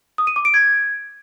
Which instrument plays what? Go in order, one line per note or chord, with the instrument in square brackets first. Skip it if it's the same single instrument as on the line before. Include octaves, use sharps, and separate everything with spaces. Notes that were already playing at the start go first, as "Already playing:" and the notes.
[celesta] D#6
D#7
D6
D7
G#6